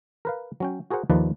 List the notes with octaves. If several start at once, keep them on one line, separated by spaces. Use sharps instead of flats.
A#4 B4 F5
F#3 C#4 G5
F#4 G#4 A#4 C5 F#5
D#2 D#3 F3 D#4 B4 D5